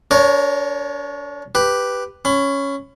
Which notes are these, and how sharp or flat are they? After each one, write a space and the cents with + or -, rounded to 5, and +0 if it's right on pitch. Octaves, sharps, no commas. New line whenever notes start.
D4 -35 A#4 +0 C#5 +0
G4 +0 B4 +0
C#4 +0 B5 +30